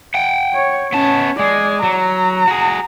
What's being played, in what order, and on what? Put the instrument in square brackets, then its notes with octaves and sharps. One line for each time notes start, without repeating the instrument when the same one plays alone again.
[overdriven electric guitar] F#5 G5
[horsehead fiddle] C#5
[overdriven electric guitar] B3 A5 [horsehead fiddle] C#4
[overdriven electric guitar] G#3 [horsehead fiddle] D5 G#5
[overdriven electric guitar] F#3 [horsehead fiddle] A#5
[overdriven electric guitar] F#4 G#4